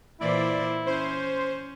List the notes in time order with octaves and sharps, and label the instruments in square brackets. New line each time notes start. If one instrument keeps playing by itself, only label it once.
[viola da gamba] A#2 E3 C5 [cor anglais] E4 [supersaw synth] D5
[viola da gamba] C#4 [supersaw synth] C5